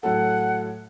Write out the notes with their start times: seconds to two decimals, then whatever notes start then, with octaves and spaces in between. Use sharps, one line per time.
0.03 A2 F#3 A4 F#5